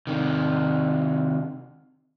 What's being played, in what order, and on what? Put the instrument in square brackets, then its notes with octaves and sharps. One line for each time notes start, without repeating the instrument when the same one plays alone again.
[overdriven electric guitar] C3 D#3